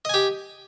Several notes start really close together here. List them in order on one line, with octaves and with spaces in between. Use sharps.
D#5 G#5 G4